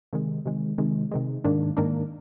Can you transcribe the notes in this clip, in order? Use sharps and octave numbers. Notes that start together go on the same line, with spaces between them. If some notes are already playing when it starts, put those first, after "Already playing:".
C3 D#3 G#3
C3 D#3 G#3
C3 D#3 G#3
C3 D#3 G#3
G#2 D#3 A#3 D4
G#2 D#3 A#3 D4